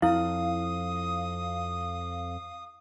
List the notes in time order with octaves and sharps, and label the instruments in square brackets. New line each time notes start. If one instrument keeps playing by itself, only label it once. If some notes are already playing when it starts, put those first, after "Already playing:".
[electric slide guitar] F2 [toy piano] E4 [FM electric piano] F5 [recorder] D#6